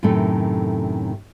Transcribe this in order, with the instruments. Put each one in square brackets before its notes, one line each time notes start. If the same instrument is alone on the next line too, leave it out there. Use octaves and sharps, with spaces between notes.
[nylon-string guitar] F#2 A2 C3 D#3 A3 A4